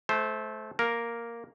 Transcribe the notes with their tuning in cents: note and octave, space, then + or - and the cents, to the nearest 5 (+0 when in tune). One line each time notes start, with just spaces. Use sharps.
A3 -25 C5 +0
A#3 +0 A#4 +0